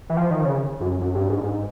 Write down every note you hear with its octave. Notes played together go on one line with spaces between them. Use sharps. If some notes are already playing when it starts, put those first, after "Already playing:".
E3
F3
D#3
C#3
F#2
F#2
G2
G#2
G#2